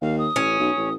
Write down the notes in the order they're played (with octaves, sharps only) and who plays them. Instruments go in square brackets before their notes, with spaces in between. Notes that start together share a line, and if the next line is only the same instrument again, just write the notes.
[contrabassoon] D#2 [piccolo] F5
[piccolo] D#6
[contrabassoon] A1 [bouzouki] C#4
[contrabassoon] B1
A1